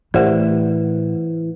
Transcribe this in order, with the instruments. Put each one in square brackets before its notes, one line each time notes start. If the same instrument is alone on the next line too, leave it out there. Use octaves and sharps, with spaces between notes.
[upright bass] A2 [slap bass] E3 [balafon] A3 G4 A#4 [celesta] C5 D5 F#5